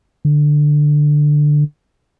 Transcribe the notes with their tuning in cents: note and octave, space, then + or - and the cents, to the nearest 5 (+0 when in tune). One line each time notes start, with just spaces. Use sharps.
D3 +10